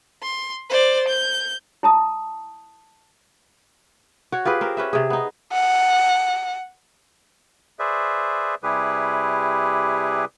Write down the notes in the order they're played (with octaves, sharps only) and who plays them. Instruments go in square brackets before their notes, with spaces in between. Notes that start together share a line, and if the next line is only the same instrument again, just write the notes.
[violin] C6
C5 D5
G6
[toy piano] E4 A5 D#6
[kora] F#4 C#5
F4 G4 G#4 B4
C4 A#4
C#4 B4 E5
C3 G#4
B3 D#4
[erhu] F#5
[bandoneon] G#4 B4 C5 D5 E5
C3 G3 E4 G4 G#4 B4